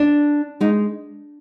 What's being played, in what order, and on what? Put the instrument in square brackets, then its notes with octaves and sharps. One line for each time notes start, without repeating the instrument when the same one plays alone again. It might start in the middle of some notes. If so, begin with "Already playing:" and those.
Already playing: [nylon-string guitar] D4
G#3 D#4